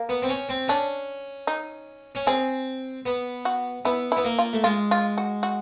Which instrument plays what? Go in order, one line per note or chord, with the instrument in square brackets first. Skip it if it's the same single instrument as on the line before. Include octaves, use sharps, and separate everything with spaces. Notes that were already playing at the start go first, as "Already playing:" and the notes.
Already playing: [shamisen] A#3
[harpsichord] B3
C4
C#4
C4
[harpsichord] C#4 [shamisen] D4
[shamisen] D#4
[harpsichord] C#4
[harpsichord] C4 [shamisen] G#4
[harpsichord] B3
[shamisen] F#4
[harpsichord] B3 [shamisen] E4
[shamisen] E4
[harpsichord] B3
A#3
[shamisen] F4
[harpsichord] A3
[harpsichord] G#3 [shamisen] F4
[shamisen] F4
F#4
F#4